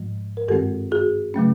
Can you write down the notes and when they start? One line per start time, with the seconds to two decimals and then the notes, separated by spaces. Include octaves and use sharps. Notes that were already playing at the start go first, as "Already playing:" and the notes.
Already playing: G#2 F3 G#3
0.37 A#4
0.48 G2 D#3 G#3 C4 G4 A4
0.92 F#4 G#4
1.34 C#3 F#3 A3 C#4